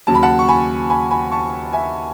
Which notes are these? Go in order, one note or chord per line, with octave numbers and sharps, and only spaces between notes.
D#2 C#3 F#3 A5
B5
F#5 A5
C#6
G#5 B5
G#5 B5
G#5 B5
A5 C#6
E5 G#5